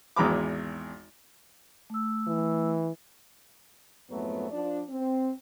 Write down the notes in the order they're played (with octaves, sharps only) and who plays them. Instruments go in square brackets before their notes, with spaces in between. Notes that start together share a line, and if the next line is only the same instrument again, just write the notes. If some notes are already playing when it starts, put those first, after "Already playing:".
[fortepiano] G#1 E2 G#3 A#5 B5 D6
[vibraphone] A3 E6
[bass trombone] E3
[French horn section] F2 G#2 F#3 A3 B3
F3 D4
C4